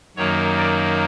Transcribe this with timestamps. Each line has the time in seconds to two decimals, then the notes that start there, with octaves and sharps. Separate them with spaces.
0.16 F#2 D#3 F#3 A#3 C#5
0.57 D5